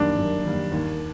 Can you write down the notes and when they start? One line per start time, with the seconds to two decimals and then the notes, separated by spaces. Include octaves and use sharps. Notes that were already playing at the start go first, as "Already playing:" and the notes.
Already playing: F#2 D#3 G3 A#3 D4
0.17 F#2
0.45 D#3 G3 A#3
0.72 D#2